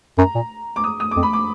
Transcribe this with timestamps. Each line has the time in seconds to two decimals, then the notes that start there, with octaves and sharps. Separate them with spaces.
0.18 F#2 A#5
0.35 A#2
0.76 D6
0.84 D#6
1.00 D#6
1.11 D6
1.17 F2
1.23 B5
1.33 D6